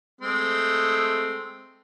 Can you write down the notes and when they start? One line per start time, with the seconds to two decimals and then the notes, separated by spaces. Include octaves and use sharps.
0.21 G#3 A3 C4